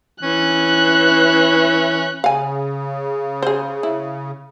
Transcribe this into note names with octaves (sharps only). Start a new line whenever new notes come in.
E3 C#4 F#6
C#3 F5 G#5
G#4 C5
E4